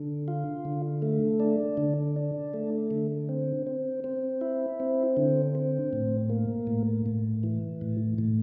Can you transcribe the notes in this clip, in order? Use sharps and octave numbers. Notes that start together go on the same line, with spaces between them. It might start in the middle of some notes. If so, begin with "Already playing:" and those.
Already playing: D3
F4
D3
A3
D4
D3
D4
A3
D3
C4
C4
C4
E4
C4
D3
C4
A2
A#3
A2
A2
E3
A2
A2